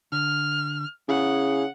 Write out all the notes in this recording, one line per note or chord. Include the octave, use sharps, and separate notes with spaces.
D3 F6
C#3 E4 G#4 F#5